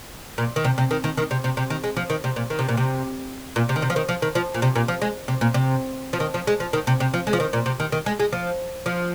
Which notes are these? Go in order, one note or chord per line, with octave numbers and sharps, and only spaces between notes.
A#2
D#3
C3
C3
D#3
D#3
D#3
C3
C3
C3
D#3
G#3
F3
D#3
C3
A#2
D#3
C3
A#2
C3
A#2
C3
D#3
C3
F3
D#3
F3
D#3
F3
A#2
C3
A#2
F3
G#3
C3
A#2
C3
F3
D#3
F3
G#3
F3
D#3
C3
C3
F3
G#3
F3
D#3
A#2
C3
D#3
D#3
G#3
G#3
F3
F3